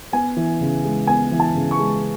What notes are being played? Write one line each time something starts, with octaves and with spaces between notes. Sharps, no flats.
B3 G#5
E3
C#3
G#3
B3 G#5
E3
A5
C#3
C#6
G#3